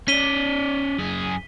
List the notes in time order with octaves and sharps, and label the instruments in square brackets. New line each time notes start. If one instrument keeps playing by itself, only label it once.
[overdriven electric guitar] C#4 D5 [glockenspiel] B6 D#7 G7
[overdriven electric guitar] F#2 G#4